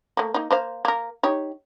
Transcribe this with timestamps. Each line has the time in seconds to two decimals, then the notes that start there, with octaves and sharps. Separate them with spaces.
0.17 A3 A#3
0.34 A#3 D#4
0.51 A#3 C5 F5
0.85 A#3 A#4
1.23 D#4 G4 C#5